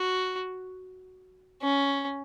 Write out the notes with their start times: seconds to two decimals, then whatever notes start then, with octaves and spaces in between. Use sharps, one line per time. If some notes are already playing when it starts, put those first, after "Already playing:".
Already playing: F#4
1.62 C#4